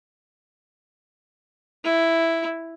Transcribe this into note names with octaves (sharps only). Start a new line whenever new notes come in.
E4